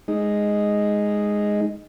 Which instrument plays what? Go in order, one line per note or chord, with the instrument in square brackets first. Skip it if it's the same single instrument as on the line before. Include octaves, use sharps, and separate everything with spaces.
[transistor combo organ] G#3 D#4